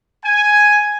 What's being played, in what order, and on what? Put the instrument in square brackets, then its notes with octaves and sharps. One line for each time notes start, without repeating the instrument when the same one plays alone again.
[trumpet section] G#5